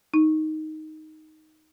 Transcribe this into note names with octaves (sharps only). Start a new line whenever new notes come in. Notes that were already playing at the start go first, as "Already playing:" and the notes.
D#4